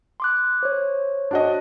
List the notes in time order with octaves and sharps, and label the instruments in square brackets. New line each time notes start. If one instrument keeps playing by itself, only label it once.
[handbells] C6 D6 F#6
C5 C#5
[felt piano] D4 F#4 D#5